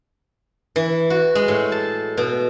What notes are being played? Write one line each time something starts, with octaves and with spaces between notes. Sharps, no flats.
E3
F#4
G#3
A2
A5
B2